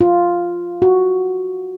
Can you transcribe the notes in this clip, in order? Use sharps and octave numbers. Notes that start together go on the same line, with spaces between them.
F4
F#4